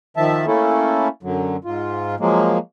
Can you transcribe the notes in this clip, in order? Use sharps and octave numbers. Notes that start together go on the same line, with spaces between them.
D#3 F3 E5 A5
A3 A#3 C#4 E4 A4
F#2 D3 F#3
G#2 F4
F3 F#3 G#3 A#3